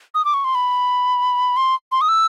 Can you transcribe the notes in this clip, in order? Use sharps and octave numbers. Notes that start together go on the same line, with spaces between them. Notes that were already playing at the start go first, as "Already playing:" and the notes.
D#6
D6
C#6
C6
B5
C6
C6
D#6
E6